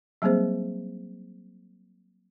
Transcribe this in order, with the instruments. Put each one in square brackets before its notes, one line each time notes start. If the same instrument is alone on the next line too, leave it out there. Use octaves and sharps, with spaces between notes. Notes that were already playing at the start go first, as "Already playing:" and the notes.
[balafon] F#3 G3 A#3 C4 G#4 C5